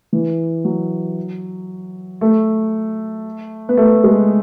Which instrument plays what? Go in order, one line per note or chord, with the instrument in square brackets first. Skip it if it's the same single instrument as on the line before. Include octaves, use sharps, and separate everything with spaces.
[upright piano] E3
F#3
A3
B3
A3
G#3